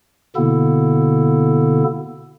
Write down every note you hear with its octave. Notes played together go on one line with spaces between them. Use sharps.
B2 D3 A#3 B3 E4 A4